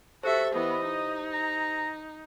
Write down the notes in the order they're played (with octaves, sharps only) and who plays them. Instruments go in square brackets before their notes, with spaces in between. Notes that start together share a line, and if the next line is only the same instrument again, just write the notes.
[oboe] F#4 [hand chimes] G4 C5 [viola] A4 E5
[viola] E3 B3 [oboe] D#5
[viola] D#4
[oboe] A#5